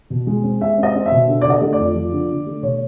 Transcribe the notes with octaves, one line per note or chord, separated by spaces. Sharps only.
B2
G#3
C4
G#3 E5
C4
D#5
C4
E5
B2
D3
D5
D3 D#5
A3
D5
F2
F3
D3
D3
A3
B2 C#5